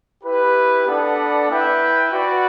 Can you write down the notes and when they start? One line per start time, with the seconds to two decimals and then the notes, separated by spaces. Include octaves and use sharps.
0.23 E4 G4 B4
0.86 B3 D4 A4 D5 F#5
1.49 E4 B4 E5 G5
2.12 F#4 B4 D5 F#5